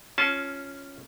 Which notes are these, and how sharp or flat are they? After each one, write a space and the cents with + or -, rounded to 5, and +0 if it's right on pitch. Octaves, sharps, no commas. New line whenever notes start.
C#4 +0 F4 +0 A5 -30